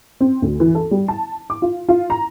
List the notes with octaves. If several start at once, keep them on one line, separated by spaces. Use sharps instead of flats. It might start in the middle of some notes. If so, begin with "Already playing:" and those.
C4
D2
E3
A4
G3
A5
D6
F4
F4
A#5